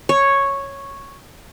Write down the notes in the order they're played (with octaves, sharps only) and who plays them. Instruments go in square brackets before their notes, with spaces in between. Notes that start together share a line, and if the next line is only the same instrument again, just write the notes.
[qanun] C#5